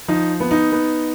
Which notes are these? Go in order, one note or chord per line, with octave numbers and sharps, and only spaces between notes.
F3 D#4
B3
D#4
B3